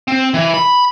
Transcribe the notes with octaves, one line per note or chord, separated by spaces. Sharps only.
C4
E3
B5